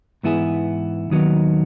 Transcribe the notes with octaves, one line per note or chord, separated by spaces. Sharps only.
G#2 E3 B3 E4 G#4
D#2 D#3 F#3 B3 D#4